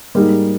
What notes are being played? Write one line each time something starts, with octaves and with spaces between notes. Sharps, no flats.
G#2 G3 A#3 D#4 G#4